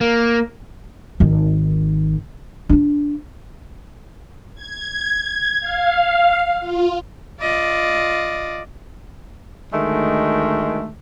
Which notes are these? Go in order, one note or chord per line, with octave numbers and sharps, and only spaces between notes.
A#3
G#1 D#3
D4 F4
G#6
F5
F4
F4 D5 D#5
D2 D#3 G#3 A3